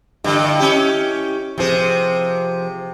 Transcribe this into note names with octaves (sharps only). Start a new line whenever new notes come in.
G2 D3 E4 D#5
C#4 G4
C3 F3 G#4 C5